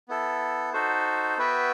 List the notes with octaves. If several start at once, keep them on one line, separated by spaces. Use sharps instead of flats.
B3 E4 A4
D#4 F#4 A4 C5
B3 F#4 B4 E5 G5